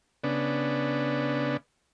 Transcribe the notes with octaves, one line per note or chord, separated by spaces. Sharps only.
C#3 B3 D4